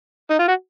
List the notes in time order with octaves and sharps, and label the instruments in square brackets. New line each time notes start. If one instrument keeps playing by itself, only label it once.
[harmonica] D#4
F4
F#4